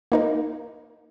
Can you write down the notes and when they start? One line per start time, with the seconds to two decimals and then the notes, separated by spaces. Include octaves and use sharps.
0.12 A#3 D#4 A#4